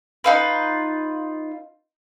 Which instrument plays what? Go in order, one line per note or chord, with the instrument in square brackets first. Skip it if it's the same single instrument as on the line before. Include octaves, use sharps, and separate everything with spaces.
[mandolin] D#4 F4 B4